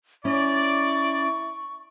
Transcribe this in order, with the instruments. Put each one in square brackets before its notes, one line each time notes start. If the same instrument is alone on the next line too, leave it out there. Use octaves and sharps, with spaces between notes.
[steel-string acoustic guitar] C#4 [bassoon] E4 [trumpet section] D5 [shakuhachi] C#6